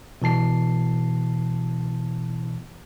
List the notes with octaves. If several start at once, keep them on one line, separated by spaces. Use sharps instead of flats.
B2 E3 A5 C7